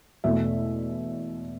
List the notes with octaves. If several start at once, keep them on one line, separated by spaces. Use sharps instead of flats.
E2 B2 A3 E5